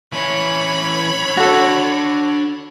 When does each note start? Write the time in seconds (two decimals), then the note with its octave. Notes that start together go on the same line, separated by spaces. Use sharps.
0.13 E3 C#4 C#5 B5
1.37 D4 F#4 A4 F#5